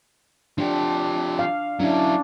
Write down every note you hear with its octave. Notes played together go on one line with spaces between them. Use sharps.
F3 D4 G4
F5
F#3 C#4 D4 E4